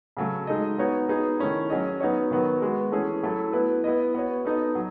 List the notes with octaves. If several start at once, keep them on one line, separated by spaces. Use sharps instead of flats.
C#3 F#3 A3
G#3 D#4 A4 D#5
B3 D#4 F#4 C#5
B3 D#4 G#4
D#3 A3 C#4 E4
F#3 C#4 G#4 D#5
F#3 B3 D#4 F#4 C#5
D#3 F#3 B3 F#4
G#3 B3 F#4
E3 A3 C#4 G#4
F#3 A3 E4 A4
B3 E4 B4
B3 E4 B4 D#5
B3 F#4 C#5
B3 D#4 A4 D#5
F#3